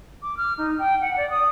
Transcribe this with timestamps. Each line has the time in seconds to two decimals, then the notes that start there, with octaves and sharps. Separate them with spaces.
0.22 D6
0.37 F6
0.57 D#4
0.79 G5
1.01 F#5
1.17 D5
1.30 D#6